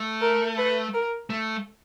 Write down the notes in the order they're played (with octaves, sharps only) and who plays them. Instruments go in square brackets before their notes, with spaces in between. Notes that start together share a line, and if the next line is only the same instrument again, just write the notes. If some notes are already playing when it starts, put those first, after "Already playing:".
Already playing: [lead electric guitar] A3
[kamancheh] A#4
B4
A#4
[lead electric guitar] A3